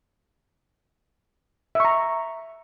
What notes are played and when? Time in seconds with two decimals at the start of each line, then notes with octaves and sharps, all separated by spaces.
1.75 E5
1.80 C#6
1.85 A#5